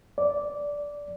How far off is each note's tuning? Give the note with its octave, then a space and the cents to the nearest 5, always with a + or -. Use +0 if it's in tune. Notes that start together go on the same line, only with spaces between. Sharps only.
D5 -10